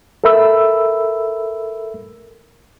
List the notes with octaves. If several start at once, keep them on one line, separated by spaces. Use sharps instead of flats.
A4 A#4 E5 B5 E6